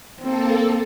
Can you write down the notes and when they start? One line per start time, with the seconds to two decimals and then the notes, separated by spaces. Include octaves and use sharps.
0.21 A#3 C4 A4